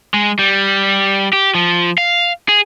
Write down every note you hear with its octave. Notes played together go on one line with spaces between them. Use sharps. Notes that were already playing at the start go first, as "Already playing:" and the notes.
G#3
G3
G4
F3
F5
G#4